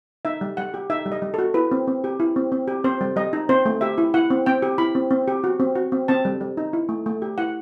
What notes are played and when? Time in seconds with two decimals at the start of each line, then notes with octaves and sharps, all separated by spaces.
0.25 D#4 E5
0.41 G3
0.57 G3 F#5
0.74 G4
0.90 D#4 E5
1.06 G3
1.12 D#5
1.22 G3
1.34 F#4 A4
1.54 E4 B4
1.71 C4
1.87 C4
2.04 G4
2.20 E4
2.36 C4
2.52 C4
2.68 G4
2.84 C4 C5
3.01 G3
3.16 G3 D#5
3.33 D#4
3.49 C4 C5
3.66 A3
3.81 G4 E5
3.98 E4
4.14 E4 F#5
4.30 C4
4.46 C4 G5
4.62 G4
4.78 E4 B5
4.95 C4
5.11 C4
5.28 G4
5.44 F#4
5.60 C4
5.75 F#4
5.92 C4
6.08 C4 A5
6.25 G3
6.41 G3
6.57 D#4
6.73 E4
6.89 A3
7.06 A3
7.22 G4
7.38 E4 F#5